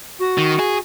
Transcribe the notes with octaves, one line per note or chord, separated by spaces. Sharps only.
F#4
D#3
G#4